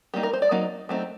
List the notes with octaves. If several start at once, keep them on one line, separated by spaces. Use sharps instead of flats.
G3 A#3 D#4 G4
A#4
C5
D5
F#3 A#3 D#4 D#5
F#3 A3 C4 D#4